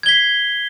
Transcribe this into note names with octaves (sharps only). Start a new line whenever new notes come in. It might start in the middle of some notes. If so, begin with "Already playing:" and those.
G#6 B6 C7 G7